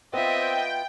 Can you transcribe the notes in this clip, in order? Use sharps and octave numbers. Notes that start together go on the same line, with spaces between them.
B3 C4 F4 D#5 E5 G5